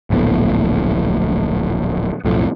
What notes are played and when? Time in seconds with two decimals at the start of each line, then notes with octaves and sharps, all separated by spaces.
0.10 D1 A#1 A2 B3
2.25 B1 F2 A2